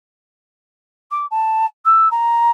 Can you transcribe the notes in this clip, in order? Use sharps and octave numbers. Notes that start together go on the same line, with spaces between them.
D6
A5
E6
A#5